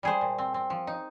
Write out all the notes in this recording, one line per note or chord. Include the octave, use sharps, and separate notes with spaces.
G3 G#4 C5
A#2
C4
C4
F3
D#4